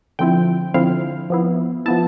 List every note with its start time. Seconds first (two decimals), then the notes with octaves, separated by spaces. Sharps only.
0.19 D3 F3 C4 E4 G5
0.74 D3 F3 C4 E4 F5
1.30 F3 B3 E4
1.86 F3 B3 E4 A5